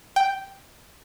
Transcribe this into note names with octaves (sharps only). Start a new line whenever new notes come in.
G5